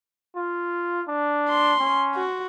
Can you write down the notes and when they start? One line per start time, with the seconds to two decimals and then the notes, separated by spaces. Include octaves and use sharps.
0.36 F4
1.08 D4
1.49 C6
1.80 C#4
2.14 F#4